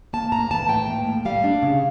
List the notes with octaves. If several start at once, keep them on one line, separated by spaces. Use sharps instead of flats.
A#3 A5
A2 A#5
E3 A5
A2 G5
A#3
A2
G3 F5
D4
C#3